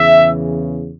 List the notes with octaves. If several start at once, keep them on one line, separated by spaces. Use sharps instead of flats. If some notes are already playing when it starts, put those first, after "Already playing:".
Already playing: E2 C#3 E3 E5